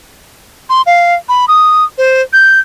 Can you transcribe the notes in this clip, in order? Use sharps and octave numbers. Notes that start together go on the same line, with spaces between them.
C6
F5
B5
D#6
C5
G6